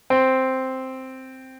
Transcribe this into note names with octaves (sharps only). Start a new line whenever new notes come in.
C4